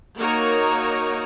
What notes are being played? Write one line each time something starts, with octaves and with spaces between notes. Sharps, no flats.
A#3 D#4 F#4 A#4 C#5 A#5